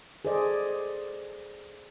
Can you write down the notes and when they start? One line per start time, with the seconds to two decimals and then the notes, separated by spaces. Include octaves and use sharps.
0.25 G#4 A4 C5 D5 D#5